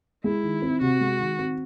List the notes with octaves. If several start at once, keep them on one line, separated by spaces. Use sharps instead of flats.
G#3 E4
D#3
C4
C3 F#4
G#3
D#3
C4